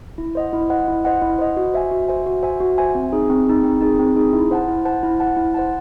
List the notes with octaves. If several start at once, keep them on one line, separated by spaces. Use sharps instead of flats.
E4
C5 D#5 F#5
E4
C5 D#5 F#5
E4
C5 D#5 F#5
E4
C5 D#5 F#5
F#4
C5 E5 G#5
F#4
C5 E5 G#5
F#4
C5 E5 G#5
F#4
C5 E5 G#5
C4
D#4 G#4
C4
D#4 G#4
C4
D#4 G#4
C4
D#4 G#4
E4
C5 F#5 A5
E4
C5 F#5 A5
E4
C5 F#5 A5
E4
C5 F#5 A5